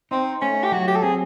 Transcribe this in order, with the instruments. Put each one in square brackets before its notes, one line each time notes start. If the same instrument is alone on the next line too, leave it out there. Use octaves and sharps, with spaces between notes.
[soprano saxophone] C4 [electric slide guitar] D#4
[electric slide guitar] A3 [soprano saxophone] C#4
[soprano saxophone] G4
[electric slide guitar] F#3 [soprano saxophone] F#4
[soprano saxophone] G4
A4
[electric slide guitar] C4 [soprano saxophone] G#4